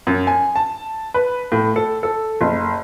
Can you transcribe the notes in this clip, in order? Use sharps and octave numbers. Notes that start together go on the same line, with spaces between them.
F#2
G#5
A5
B4
A2
A4
A4
F#1